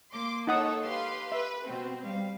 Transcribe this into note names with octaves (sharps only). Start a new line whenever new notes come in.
A#3 C6 D6
D#4 A4 C#5 F#5 A5 D#6
G4 B4 F5 C6
B4 E5
B2 C4 F#4
G3 F5